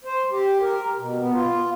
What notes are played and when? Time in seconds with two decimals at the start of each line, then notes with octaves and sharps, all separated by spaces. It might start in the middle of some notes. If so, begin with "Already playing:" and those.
0.05 C5
0.31 G4
0.61 A#4
0.98 B2
1.20 B3
1.33 F4